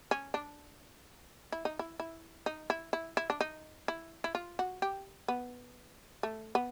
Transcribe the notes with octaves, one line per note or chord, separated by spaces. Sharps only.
C#4
D4
E4
D#4
E4
E4
D#4
E4
E4
E4
D4
D#4
E4
E4
F4
F#4
G4
B3
A3
B3